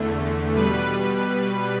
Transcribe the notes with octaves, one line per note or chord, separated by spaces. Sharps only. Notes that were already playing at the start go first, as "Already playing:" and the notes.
Already playing: E2 D3 A3
B2 G3 B4